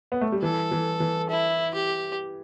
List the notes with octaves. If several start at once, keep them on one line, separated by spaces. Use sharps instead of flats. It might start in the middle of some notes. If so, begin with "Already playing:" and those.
B3
A3
G3
E3 A4
E3
E3
E4
G4